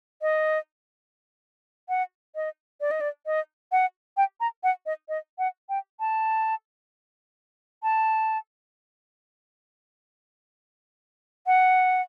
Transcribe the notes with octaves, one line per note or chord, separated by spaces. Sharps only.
D#5
F#5
D#5
D5
D#5
D5
D#5
F#5
G5
A#5
F#5
D#5
D#5
F#5
G5
A5
A5
F#5